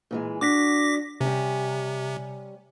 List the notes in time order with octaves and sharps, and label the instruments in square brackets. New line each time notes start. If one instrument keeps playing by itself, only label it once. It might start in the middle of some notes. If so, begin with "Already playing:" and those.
[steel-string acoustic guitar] A#2 E3 G#3
[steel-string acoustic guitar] D4 F#4 [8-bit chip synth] D6 A#6 B6
[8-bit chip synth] C3 [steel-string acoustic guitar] G3 C#4